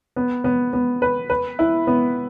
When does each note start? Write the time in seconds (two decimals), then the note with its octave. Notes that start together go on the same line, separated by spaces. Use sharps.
0.16 B3
0.44 B3
0.73 B3
1.02 B4
1.30 B4
1.59 E4
1.87 B3